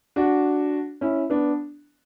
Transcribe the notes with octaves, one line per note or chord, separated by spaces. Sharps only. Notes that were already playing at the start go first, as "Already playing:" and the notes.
D4 F#4
C#4 E4
B3 D4